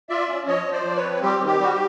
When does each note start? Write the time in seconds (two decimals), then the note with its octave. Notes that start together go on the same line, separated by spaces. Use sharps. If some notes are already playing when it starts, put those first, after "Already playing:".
0.09 F4 D5 E5
0.29 C#4
0.47 F3 C#5 D#5
0.66 F3
0.72 C5 D5
0.85 F3 D5
0.97 B4 C#5
1.03 C4
1.22 G3 G4
1.40 D#3
1.47 G4
1.60 G3 F#4
1.73 G4